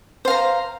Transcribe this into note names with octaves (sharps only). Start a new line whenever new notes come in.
C5 F5 A#5